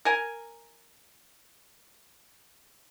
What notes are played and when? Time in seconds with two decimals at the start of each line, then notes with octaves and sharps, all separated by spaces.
0.05 A#4 G#5